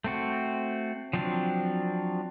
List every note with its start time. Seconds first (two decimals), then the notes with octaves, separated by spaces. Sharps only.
0.04 A3 C4 F#4
1.13 F3 F#3 C4 D4